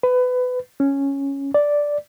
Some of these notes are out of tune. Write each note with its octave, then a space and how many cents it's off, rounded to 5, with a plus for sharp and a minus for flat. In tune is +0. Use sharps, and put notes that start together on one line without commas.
B4 +25
C#4 -5
D5 -5